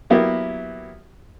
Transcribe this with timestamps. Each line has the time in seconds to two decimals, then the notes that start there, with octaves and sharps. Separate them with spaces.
0.10 F#3 A#3 B3 E4 G4